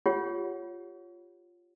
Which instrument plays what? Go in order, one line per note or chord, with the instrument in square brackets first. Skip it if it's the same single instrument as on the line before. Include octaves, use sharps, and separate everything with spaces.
[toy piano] F4 G4 C#5 F#5